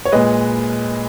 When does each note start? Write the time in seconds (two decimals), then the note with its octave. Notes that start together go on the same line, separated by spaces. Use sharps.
0.05 C#5
0.12 A#2 G#3 B4 D#5